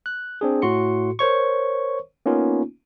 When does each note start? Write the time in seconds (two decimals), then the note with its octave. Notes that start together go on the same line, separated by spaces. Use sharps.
0.06 F#6
0.41 C4 D4 G#4
0.62 A2 F#4 C6 C#7
1.19 A#4 C5 C#5 C#6
2.26 A#3 B3 C#4 D#4 F4